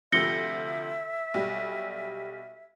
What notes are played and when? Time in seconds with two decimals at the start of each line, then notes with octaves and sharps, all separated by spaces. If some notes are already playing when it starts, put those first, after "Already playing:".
0.12 D2 C3 F3 E5 A#6 C#7 G7
1.34 B1 G3